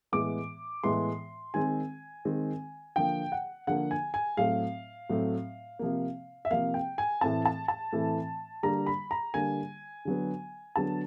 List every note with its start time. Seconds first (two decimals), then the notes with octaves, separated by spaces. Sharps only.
0.12 A2 E3 G#3 B3 D6
0.84 A2 E3 G#3 B3 C6
1.54 D#3 G#3 C4 G#5
2.25 D#3 G#3 C4
2.96 D3 F3 A#3 G5
3.32 F#5
3.67 D3 F3 A#3 F#5
3.91 G#5
4.14 G#5
4.37 A2 F#3 A3 C4 F5
5.10 A2 F#3 A3 C4
5.79 C3 F3 A#3
6.45 E5
6.50 C3 F3 A#3 F5
6.74 G5
6.98 G#5
7.21 A2 E3 A3 C4 A5
7.46 A5
7.68 A5
7.92 A2 E3 A3 C4
8.63 D3 G3 A#3 A#5
8.86 B5
9.11 A#5
9.34 D3 G3 A#3 G#5
10.05 D3 F#3 B3
10.76 D3 F#3 B3 A5